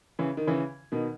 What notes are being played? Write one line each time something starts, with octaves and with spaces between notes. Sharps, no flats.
C#3 E3
D#3
C#3 E3
B2 D#3